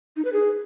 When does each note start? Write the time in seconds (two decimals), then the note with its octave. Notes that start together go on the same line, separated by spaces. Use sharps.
0.16 D#4
0.25 B4
0.33 G#4